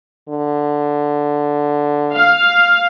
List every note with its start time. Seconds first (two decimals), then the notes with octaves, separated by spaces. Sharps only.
0.29 D3
2.15 F5